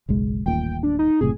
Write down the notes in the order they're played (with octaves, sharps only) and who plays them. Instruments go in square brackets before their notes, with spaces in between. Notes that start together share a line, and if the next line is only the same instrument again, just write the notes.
[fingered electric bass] F#1 B1 G#3
[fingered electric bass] D#1 A1 A#2 [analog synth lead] G5
[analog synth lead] D4
D#4
[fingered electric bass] F#1 A2 C3 [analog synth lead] G#4